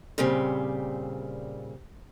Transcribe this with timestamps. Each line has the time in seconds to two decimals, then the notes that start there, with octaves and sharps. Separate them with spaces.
0.18 A#2 C#3 G3 C4